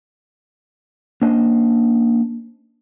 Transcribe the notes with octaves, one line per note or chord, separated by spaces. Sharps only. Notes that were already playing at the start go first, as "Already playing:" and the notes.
A#3 C#4 D4 C5 D#5